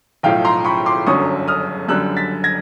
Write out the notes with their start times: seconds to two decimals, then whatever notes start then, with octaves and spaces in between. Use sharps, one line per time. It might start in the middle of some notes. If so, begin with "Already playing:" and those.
0.23 B1 A2 F3 F5 G5
0.45 A#5 C6
0.65 B5 C#6
0.86 C6 D6
1.07 G1 F#2 D3 F#3 C#6 D#6
1.48 D#6 F6
1.88 F#2 D3 G3 E6 F#6
2.17 A6 B6
2.44 G#6 A#6